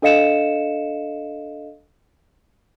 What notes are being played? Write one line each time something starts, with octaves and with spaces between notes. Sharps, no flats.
D4 A4 D#5 F5 C#7 E7